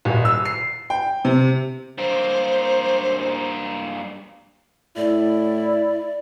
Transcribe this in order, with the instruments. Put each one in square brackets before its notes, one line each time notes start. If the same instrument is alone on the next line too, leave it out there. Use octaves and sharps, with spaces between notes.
[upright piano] D#1
E6
C7
G5
C3
[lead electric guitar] G2 A#3 [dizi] C5
[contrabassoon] A2 [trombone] E4 [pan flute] D5